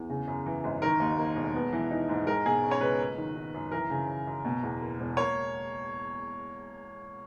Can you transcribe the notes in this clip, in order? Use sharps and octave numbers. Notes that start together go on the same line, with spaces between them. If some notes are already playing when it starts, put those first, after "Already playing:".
Already playing: E2
C#3
F#2
E3
G#1
D#3 A#4
D#2
A#3
E1
B3
E3
D#4
G#2
G#3 A#4
B2 G#4
C#4
C#5
C#2 B4
A#3
D#3
D#4
F#2
E3 A#4
C#3
F#2
F#2
B2
E2
A#3
E1
A#3 C#5